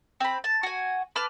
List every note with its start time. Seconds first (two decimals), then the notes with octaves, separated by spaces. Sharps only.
0.20 C4 B5
0.44 A5
0.63 F#4 G#5
1.16 B4 A5 D6 F6